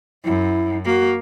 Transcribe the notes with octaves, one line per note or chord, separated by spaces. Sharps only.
F#2 E4
A#3 F#4